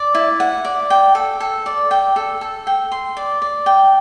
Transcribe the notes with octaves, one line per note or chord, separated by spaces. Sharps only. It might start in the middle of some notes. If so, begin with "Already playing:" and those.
Already playing: D5
E4
F#5
D5
G5
A4
A4
D5
G5
A4
A4
G5
C6
D5
D5
G5